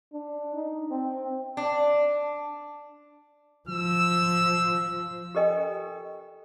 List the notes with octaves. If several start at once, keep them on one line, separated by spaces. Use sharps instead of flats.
D4
D#4
C4
D4
F3 E6
G4 A4 A#4 D#5 G5 G#5